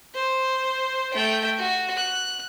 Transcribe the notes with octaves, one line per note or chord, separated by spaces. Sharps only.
C5
A3 G5
F#4
F#6